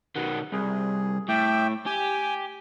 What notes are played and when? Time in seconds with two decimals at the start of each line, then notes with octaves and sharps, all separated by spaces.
0.16 B2 D#3 F#5
0.53 C2 G#4
1.29 A2 E5 G5 D6
1.86 G4 G#5